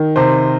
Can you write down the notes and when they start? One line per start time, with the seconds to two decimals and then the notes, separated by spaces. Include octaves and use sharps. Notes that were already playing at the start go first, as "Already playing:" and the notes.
Already playing: D#3
0.16 C3 C5